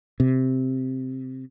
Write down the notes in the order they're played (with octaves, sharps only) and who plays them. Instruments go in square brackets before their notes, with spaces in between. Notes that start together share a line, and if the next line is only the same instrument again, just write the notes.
[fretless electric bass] C3